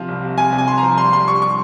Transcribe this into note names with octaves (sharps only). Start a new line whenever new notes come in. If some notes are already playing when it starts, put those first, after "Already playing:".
Already playing: C3 F3 F5
C2
C3
C3 G#5
C2
G#5
C3 C6
A#5
F3
G3 C6
G3 C6
G3 C#6
C#6